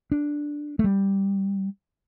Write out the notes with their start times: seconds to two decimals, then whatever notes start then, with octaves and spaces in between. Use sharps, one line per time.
0.12 D4
0.79 A3
0.84 G3